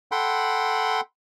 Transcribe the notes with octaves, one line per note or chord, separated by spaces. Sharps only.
A4 F#5 G5 B5 C6